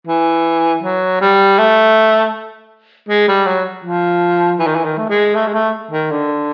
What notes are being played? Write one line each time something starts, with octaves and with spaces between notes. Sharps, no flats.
E3
F#3
G3
A3
G#3
G3
F#3
F3
E3
D#3
E3
D#3
A3
G#3
A3
G#3
A3
D#3
D3